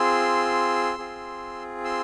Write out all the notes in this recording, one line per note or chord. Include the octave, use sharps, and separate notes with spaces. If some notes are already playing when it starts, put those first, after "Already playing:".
Already playing: C4 F4 G#4 C6 E6
C4 F4 G#4
C6 E6